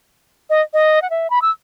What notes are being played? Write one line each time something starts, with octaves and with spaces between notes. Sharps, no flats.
D#5
D#5
F#5
E5
B5
E6